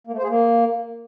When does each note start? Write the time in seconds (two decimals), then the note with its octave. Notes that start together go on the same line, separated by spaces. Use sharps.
0.07 A#3
0.12 A3
0.18 C5
0.23 G#4
0.29 A#3